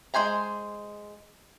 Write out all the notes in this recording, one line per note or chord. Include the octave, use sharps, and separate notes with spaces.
G#3 F#4 C5 G#5 A#5